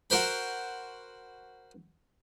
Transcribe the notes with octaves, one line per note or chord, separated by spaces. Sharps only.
F#4 A#4 C5 B5